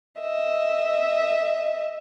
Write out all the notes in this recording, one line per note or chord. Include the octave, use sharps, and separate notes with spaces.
D#5 E5